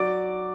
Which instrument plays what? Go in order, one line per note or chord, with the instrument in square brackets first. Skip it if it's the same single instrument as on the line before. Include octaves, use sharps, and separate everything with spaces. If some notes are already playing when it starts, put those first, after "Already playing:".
Already playing: [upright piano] F#3 D5 D6